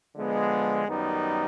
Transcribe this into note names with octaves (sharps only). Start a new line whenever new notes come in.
D3 F3 G#3 B3
F#2 D#3 G3 B3 D#4